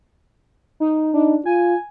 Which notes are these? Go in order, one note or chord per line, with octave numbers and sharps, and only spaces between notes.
D#4
D4 D#4
F4 G#5